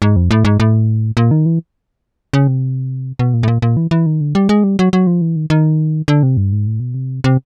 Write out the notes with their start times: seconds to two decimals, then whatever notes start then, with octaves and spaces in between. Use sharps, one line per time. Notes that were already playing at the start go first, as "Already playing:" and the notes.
0.02 G#2
0.16 F2
0.31 A2
0.45 G#2
0.60 A2
1.17 A#2
1.31 D#3
1.46 E3
2.33 C#3
2.48 C3
3.19 B2
3.34 A#2
3.43 A2
3.48 A#2
3.62 A#2
3.77 E3
3.91 E3
4.06 D#3
4.21 D3
4.35 G3
4.49 G#3
4.64 G3
4.79 F#3
4.93 F#3
5.07 F3
5.21 E3
5.36 D#3
5.50 D#3
6.08 D3
6.23 C3
6.37 G2
6.52 G#2
6.67 A2
6.80 B2
6.94 C3
7.24 C3